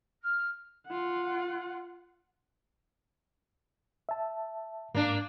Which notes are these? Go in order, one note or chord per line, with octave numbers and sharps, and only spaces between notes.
F6
F4 F#5
E5 A5
G#2 A#3 D4